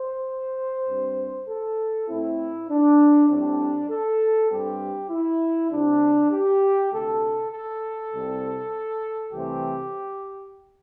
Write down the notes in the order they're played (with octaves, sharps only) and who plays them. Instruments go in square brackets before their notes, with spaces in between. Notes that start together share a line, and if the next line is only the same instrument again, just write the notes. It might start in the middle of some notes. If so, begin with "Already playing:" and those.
Already playing: [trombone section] C5
G2 G3 C4
A4
A2 A3 C4 E4
D4
A2 G3 C4 D4
A4
G2 G3 C4 G4
E4
C2 C3 G3 C4 D4
G4
D2 C3 A3 A4
A4
C2 C3 G3 C4
C2 C3 E3 A3 C4 G4